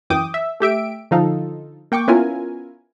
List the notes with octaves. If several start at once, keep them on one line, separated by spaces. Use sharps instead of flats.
F#2 E3 G5 D6 D#6
E5
A3 G4 E5 D7
D3 F3 D#4 F4 A4
A#3 G5 C#6 D6
B3 C#4 E4 F4 A#4 G#5